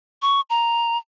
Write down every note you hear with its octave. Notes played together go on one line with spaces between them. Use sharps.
C#6
A#5